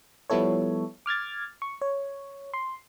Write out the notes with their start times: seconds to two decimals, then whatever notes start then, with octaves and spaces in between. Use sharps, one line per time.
0.30 F3 G3 B3 E4 A4 C#5
1.06 D6 F6 G#6 A6
1.62 C#6
1.81 C#5
2.54 C6